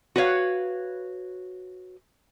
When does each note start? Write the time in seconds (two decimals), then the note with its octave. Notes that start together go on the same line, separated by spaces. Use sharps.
0.16 F#4 B4 C#5 F5